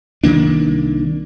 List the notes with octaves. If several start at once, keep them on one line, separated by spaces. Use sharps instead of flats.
C2 D#3 A#3 D4